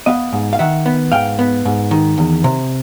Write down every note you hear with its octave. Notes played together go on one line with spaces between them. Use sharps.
B3 D#5 F5
G#2
F5
D#3 E5 F#5
B3
G#2 F5 G5
B3
G#2
D#3
E2
C3